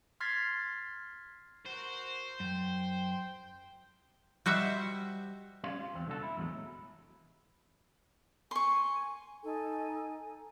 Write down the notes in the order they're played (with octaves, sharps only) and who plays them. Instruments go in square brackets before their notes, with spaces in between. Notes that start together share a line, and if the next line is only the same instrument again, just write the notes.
[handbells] C6 F6 G#6 A6 B6 C7
[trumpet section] F#4 A#4 [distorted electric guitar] C5
[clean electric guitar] F#2 [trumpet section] G5
[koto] G3 F#4 C5 E5
[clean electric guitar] G3 C#4 F5 C6
F4
E2 C4
C2 D3 F#4 A4
E4
E2 A2 F#3 G#3
[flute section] G#5 [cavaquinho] C6 C#6
[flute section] D#4 A4 G#5